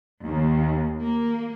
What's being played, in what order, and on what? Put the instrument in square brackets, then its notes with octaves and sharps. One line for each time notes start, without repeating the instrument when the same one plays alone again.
[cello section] D#2
A#3